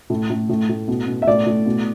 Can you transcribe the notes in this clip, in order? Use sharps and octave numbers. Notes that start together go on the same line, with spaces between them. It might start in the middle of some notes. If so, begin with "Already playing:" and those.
A2
A2
A2
A2
B2
B2
E5
A2 D5
A2
B2